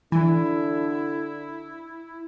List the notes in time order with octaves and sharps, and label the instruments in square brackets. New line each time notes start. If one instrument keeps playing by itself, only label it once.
[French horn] D3 [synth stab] E3 [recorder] E4